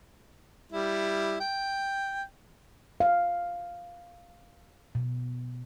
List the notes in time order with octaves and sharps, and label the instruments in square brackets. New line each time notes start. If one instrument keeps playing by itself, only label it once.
[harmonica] G3 E4
G5
[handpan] F5
B2